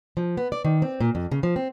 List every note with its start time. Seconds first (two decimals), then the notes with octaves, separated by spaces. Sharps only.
0.17 F3
0.37 B3
0.52 D5
0.65 D#3
0.82 C4
1.01 A#2
1.15 F2
1.31 C#3
1.43 F3
1.56 C4